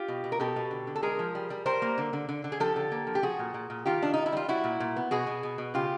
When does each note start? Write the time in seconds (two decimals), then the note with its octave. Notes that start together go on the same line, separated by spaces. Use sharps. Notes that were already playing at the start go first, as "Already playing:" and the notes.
Already playing: F4 G4
0.08 B2
0.24 B2
0.32 A#4
0.40 B2 G4 A4
0.56 B2
0.71 D3
0.87 D3
0.96 A4
1.02 G#3 G#4 A#4
1.19 F3
1.35 G3
1.50 G3
1.65 G3 A#4 C5
1.82 A#3
1.98 D3
2.13 D3
2.29 D3
2.44 D3
2.52 G#4
2.60 F3 G4 A4
2.76 D3
2.91 A#3
3.07 F3
3.15 G4
3.22 F3 F#4 G#4
3.39 A#2
3.54 A#2
3.70 A#2
3.86 D#3 F4 G4
4.02 D#3 D4
4.14 D#3 D#4
4.26 E4
4.32 G3 F4
4.48 G3 E4 F#4
4.64 A#2
4.80 A#2
4.96 B3
5.11 B2 F#4 G#4
5.27 B2
5.43 B2
5.58 B2
5.74 C#3 F4 G4